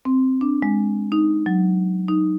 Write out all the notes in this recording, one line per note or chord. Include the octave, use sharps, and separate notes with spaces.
C4
D4
G#3
D#4
F#3
D#4